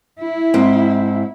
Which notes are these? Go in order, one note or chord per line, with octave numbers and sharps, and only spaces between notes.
E4
G#2 C4